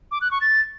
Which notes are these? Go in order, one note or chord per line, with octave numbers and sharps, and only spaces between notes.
D6
F#6
C#6
A6